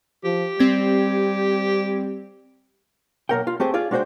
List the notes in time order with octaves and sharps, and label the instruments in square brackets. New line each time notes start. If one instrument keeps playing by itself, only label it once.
[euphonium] F3 [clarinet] G4
[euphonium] G3 [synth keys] C4 G#6
[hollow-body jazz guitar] B1 F#3 A#3 A#4 F#5 G5
F4
A3 C4 G4 G#4 C5
F4 G#4 D5
G#3 D4 F#4 A4 C5 G5